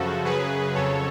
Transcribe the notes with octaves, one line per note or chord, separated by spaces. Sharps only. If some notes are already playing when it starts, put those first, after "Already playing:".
Already playing: F#2 C#3 F3 F#4 A4
F#2 C#3 F#3 G#4 B4
F2 C#3 F#3 A4 C#5